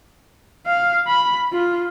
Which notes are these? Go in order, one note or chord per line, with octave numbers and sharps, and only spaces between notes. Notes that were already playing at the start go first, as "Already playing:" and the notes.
F5
B5
F4